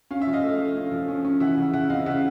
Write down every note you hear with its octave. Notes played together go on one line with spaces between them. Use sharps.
C#4 F5
E5
F3
D#5 F5
A3
A3
C#4
F3
C#4
C#4
E3 E5 F#5
C#3
C#3 E5 F#5
C4 D#5 F5
C#3 E5 F#5